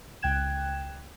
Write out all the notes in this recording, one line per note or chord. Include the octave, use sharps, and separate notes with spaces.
C#2 G5 F#6 G#6 E7